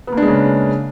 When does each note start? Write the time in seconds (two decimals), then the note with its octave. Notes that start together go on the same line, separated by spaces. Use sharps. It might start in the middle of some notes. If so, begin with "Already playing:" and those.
0.07 B3
0.12 A#3
0.17 D4
0.22 G#3
0.27 C#3